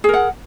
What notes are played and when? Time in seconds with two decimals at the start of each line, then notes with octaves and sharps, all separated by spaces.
0.04 G#4
0.09 A#4
0.14 F#5